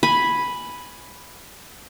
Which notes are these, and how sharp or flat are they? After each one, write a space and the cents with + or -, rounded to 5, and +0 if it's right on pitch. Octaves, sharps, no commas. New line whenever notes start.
G#5 +0 B5 +0